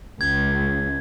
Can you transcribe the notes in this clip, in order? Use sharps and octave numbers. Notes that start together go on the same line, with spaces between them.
C#2 G#6